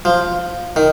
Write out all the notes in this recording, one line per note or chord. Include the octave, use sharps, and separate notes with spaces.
F3
D#3